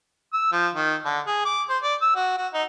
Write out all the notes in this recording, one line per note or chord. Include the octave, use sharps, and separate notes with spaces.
E6
F3
D#3
D3
G#4
D6
C5
D5
E6
F#4
F#4
D#4